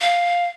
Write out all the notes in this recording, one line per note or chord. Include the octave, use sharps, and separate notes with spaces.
F5